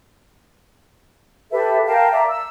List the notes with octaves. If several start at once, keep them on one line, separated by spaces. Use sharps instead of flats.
G4 A4 B4 E5
A#4 F5 G5 A5
D5 E5 A#5
E6